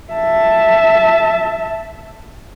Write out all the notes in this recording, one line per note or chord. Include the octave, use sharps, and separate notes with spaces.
E5 A5